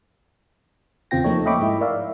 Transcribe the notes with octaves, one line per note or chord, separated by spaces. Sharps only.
E2 C#3 C4 F4 G5 A#6
F3 A3 A#3 D#4 A4 C#5
D#5 E5 G5 B5 C#6 D6
G#2 G#3 E4
A#4 D5 E5 F5